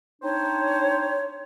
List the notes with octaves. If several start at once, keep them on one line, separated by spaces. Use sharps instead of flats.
C4 D4 D#4 C5 C#5